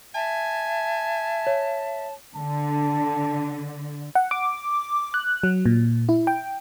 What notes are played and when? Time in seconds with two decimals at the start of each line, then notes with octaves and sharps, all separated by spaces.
0.14 E5 G#5 A5
1.47 C#5
2.35 D3 A5
4.15 F#5
4.31 D6
5.14 F#6
5.43 F#3
5.66 A#2
6.09 E4
6.27 G5